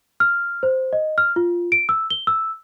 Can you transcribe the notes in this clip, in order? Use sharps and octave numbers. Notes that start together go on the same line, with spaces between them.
F6
C5
D#5
F6
F4
D7
E6
G7
E6